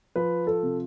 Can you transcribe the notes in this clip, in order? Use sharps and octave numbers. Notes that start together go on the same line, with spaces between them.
F3 B4
A4
C3